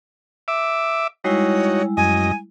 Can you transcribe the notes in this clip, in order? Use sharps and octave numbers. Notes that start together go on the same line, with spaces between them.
E5 D6
G3 G#3 D#4 E4 F#4 C#5
F#2 D#5 G#5